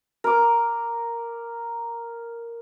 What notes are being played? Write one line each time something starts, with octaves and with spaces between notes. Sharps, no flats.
A#4 D6